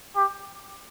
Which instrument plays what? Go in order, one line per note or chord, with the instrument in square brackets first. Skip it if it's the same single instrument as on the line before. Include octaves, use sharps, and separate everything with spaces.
[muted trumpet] G4